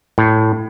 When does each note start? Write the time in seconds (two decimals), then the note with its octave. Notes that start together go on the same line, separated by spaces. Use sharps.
0.18 A2